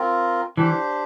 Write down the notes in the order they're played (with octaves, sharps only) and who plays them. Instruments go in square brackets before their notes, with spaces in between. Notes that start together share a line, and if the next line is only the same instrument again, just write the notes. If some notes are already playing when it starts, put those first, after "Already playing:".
Already playing: [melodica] C4 F4 A#4
[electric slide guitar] E3 [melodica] D4 G4 C5